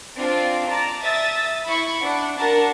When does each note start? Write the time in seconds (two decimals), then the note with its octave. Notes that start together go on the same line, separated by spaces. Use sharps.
0.16 C4 D4 F4
0.71 D5 A5 A#5
1.03 E5 D#6 A6
1.66 E4 B5 C#6
2.04 D4 F#5
2.38 D4 F#4 A#4 F#5 A5